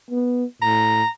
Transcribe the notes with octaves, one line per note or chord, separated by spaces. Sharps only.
B3
A2 A#5